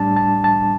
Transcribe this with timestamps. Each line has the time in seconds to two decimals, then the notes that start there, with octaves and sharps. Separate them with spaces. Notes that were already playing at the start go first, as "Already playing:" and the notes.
Already playing: A2 G3 D4 A5
0.16 A5
0.44 A5